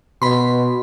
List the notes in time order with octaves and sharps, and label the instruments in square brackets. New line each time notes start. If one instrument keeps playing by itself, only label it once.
[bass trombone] B2 [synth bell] B5 C6